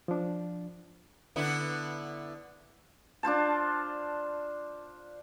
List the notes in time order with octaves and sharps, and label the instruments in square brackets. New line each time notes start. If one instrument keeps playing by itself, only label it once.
[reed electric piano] F3 D4
[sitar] D3 B3 E4
[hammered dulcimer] D4 F4 C5 A5